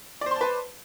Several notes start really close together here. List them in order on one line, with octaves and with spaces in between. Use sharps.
D5 C5 C6 A5 B4